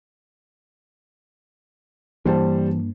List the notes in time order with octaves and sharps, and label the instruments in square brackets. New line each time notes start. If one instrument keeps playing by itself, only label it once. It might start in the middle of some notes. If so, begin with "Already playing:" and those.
[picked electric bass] G2 A#3 D4 [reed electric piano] E3 [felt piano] G3 C5 A5